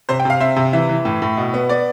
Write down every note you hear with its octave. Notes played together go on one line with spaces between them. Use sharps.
C3 C5
G5
C3 F5
C4 E5
C3
E3 E5
E3
A2
A2
B2
B3
B3 D5